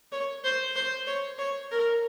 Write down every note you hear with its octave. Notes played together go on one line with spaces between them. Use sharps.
C#5
C5
C5
C#5
C#5
A#4